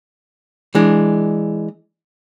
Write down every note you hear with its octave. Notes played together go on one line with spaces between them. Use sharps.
E3 G#3 D4